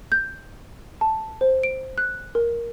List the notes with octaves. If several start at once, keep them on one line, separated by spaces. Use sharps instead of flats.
G6
A5
C5
D7
F#6
A#4